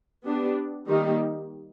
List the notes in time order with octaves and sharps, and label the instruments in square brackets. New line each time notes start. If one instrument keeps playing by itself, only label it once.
[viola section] B3 D4 G4
D#3 G3 A#3 D#4 G4